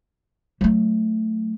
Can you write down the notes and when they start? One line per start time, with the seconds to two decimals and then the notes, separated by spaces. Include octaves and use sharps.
0.61 F#3 A3